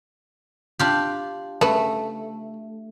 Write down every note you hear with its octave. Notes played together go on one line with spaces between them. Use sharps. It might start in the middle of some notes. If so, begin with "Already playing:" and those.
D4 F4 G4
C#3 A3 B4